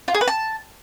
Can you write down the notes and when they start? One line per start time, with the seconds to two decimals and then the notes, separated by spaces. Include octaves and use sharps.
0.08 F4
0.14 G#4
0.21 B4
0.28 A5